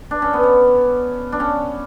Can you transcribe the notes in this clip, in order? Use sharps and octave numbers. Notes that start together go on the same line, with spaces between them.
D4
C#4
B3
C#4
D4
C#4